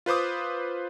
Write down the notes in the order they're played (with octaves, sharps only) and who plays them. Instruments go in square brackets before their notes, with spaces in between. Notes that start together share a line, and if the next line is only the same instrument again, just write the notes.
[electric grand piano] F4 B4 C5 D6 D#6